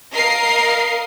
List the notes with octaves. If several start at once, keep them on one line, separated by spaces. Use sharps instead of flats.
A#4 D#5 F5 C7